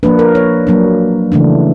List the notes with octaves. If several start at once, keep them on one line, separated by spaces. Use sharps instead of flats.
F3 A#3 D4 B4
A#4
C#5
F#3 A#3 D4
C#3 E3 A3 D4